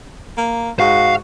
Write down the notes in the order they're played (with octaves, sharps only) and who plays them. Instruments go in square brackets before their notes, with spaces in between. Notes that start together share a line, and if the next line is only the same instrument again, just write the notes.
[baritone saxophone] A#3
[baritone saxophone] G#2 [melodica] F#4 [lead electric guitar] F5